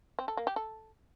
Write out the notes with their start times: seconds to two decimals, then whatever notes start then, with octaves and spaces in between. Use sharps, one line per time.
0.19 C4
0.28 A4
0.37 A#3
0.47 G4
0.56 A4